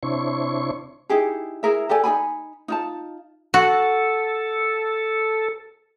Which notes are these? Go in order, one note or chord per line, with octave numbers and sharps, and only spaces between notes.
C3 D4 E4 C5 C#5 C#6
D#4 E4 G4 G#4
E4 G#4 A#4 E5
G4 A4 D5 G#5
D#4 G#4 G#5 B5
D#4 F4 A5
F#4 A4